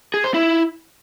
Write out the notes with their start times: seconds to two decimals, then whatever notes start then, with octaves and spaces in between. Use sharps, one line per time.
0.14 G#4
0.24 C5
0.34 E4